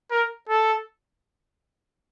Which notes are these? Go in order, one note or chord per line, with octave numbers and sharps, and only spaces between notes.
A#4
A4